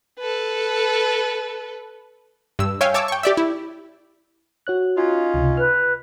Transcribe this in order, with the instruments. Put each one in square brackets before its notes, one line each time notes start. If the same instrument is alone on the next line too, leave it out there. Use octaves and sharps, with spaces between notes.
[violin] A4 B4
[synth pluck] G2 E6
C#5 E5 F5 G5 G#5
C#5 A5 D6 E6
G5 C#6
G4 D5 E5
E4
[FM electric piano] F#4 C#5 F#6
[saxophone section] C#4 D#4 F4
[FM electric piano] C#2 C3
[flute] B4 [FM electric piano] F6